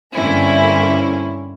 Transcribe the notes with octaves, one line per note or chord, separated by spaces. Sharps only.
G2 D3 A#3 C4 C#4 E4